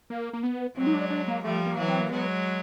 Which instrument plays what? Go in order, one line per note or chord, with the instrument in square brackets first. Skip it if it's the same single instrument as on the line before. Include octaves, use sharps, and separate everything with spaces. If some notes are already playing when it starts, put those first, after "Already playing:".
[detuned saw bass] A#3
A#3
B3
[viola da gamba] F#3 G#3 [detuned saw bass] C4
[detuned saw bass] D#4
D4
D4
A#3
[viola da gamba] F3 G3 [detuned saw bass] A3
[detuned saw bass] A#3
[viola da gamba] E3 F#3
[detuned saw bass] C4
A#3
[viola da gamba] F#3 G#3 [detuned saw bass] B3